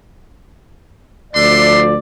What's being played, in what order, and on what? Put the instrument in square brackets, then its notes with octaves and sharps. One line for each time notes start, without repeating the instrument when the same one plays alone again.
[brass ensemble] D2 F3 D5 [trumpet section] D4 E5 C6